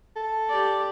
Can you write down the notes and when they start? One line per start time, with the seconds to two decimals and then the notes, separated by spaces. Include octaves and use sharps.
0.16 A4
0.50 G4 D5